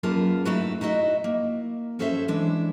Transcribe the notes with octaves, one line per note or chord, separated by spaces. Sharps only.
F#2 A#3 F4 G#4 B4 A5
A3 D#4 E4 F#4 B4
D#4 E4 F#4 D#5 E5
A#3
C#4 F#4 A4 C5 C#5 E5
E3 G#3 D4 E4